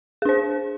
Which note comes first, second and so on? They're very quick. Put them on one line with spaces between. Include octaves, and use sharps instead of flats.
G#4 D4 C5